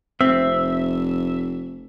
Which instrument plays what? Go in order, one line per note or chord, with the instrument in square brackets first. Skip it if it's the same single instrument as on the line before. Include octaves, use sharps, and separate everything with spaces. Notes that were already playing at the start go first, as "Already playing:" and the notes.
[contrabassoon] F1 [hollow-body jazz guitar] C4 [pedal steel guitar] E5